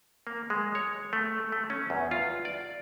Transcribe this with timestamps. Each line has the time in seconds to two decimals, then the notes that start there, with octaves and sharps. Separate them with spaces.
0.27 A#3
0.50 G#3
0.75 C#5
1.13 A3
1.52 A3
1.70 C#4
1.90 E2
2.11 F4
2.45 D5